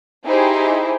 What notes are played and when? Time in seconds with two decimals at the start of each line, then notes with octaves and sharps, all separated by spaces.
0.25 D#4 E4 G4 G#4 C5